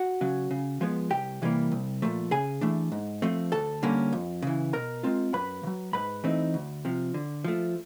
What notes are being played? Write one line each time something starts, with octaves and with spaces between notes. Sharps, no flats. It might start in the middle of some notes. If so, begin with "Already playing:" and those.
Already playing: F#4 F#5
C#3 F#3
C#3
F3 G#3 B3
C2 G4 G5
C3 E3 G3 A#3
C2
A#2 F3 A3
C#3 G#4 G#5
E3 A3 D4
G#2
F3 A3 C4
D2 A4 A5
D3 G3 A#3 C#4
F2
C#3 E3
B2 A#4 A#5
G#3 C4 F4
F#2 B4 B5
C#3
F#3
G#2 B4 B5
E3 A3 C4 D#4
D2
C3 F3
D3
F3 A3